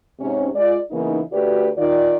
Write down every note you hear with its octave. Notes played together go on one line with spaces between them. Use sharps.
G#2 C3 C#4
G#3 F4 D5
C#3 E3 A#3 B3 D#4
D2 A3 F#4 G4 B4 D5
D#3 F4 D5